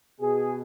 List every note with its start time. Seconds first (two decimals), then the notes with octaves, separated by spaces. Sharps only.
0.20 B2 G#4